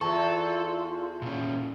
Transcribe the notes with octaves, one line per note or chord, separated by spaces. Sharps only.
E2 F4 A4 A5 C#6
A#2 C#4